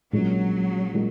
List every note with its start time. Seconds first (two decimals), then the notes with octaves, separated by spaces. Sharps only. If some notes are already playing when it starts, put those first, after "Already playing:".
0.13 A#1 A#2 F#3 G#3 C#4
0.94 A#2 G#3